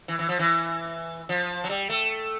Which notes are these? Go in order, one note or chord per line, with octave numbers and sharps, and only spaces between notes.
E3
E3
F3
E3
F3
F#3
G3
A3